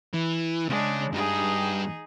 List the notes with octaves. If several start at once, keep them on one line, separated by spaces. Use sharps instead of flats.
E3
C#3 G#3 C#4 D4
G2 D#4 G4 G#4